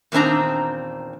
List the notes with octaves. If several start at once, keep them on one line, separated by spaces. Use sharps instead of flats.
E2 A#2 D#3 C4 D4 A#5